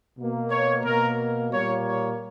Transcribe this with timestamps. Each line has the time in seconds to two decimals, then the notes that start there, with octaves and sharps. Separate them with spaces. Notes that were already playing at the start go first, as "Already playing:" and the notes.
0.18 B2 A#3
0.51 C#5
0.85 B2 A#3 A#4
1.52 A#2 G3 A#3 C#5
1.86 C#5